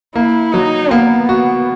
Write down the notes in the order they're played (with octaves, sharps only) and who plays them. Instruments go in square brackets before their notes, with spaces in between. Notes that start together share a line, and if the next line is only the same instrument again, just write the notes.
[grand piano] A#3 [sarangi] E4
[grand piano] F#3 [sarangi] D#4
[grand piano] A#3 [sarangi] B3
[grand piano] F#4